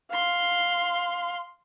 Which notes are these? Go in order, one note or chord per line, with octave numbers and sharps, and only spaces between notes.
F5 C6